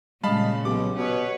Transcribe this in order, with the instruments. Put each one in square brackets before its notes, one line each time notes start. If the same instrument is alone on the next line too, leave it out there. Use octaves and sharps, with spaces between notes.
[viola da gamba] A#2 C#3 [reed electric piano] G3 G#3 D#5 [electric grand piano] F5 A5 B5
[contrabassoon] B1 [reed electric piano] G4 [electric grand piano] D6
[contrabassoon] B2 [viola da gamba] B4 C#5